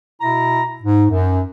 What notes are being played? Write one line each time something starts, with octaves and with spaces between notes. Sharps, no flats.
B2 E4 A#5
G#2
F#2